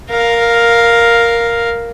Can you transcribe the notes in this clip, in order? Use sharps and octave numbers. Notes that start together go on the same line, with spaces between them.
A#4 F5